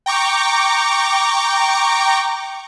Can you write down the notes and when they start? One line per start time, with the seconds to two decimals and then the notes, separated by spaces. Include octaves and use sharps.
0.06 G5 A#5 C#6 D6